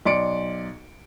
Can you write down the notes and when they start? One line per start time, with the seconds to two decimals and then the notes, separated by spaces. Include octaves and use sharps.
0.06 B1 D5 C6 C#7 D7